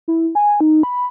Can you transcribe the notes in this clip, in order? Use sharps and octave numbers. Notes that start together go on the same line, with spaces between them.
E4
G#5
D#4
B5